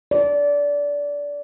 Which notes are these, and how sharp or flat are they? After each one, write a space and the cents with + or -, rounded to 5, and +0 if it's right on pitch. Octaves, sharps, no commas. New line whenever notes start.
D5 -20